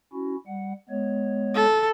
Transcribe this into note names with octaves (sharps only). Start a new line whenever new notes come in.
C#4 E4 F#4
G3 F#5
G#3 B3 C#5
A4